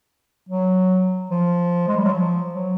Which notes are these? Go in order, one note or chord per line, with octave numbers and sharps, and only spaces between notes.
F#3
F3
G#3
G3
F#3
F3
F#3